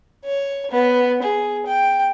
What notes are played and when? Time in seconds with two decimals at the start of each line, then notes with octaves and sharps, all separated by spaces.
0.25 C#5
0.71 B3
1.23 G#4
1.66 G5